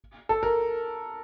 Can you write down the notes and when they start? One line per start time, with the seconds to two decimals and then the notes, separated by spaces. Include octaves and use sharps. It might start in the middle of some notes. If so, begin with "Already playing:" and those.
0.29 A4
0.43 A#4